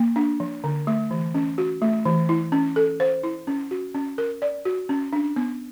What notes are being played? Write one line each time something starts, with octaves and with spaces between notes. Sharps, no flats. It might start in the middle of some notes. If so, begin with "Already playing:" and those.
Already playing: A#3
D4
F3
D3
A3
E3
C#4
F#4
A3
E3
E4
C#4
A4
C5
E4
C#4
F#4
C#4
A#4
D5
F#4
C#4
D4
B3